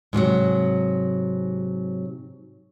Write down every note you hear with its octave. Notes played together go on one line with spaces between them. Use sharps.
G#2 C3 F3 F#3